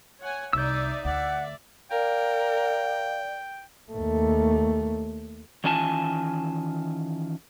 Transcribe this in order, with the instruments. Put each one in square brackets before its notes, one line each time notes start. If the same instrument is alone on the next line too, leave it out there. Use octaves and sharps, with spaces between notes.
[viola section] C#5 F#5 G#5
[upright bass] C2 [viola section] D#4 D5 E5 [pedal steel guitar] E6 G6
[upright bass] D2 [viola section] D5 E5 [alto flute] F#5
[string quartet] A#4 [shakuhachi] D5 [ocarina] F5 [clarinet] G5
[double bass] D#2 A3
[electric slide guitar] D#3 E3 C#4 F4 G#5 A5